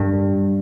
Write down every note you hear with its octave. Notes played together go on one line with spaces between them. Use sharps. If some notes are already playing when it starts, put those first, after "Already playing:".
Already playing: G2